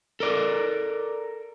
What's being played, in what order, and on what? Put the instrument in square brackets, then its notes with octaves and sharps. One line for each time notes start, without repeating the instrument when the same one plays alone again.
[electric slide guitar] A4 A#4 D5